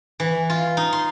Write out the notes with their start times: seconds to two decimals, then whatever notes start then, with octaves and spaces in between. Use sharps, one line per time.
0.20 E3
0.50 F4
0.77 D#4
0.93 C6